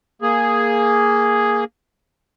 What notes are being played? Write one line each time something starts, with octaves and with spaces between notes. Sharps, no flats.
A#3 G#4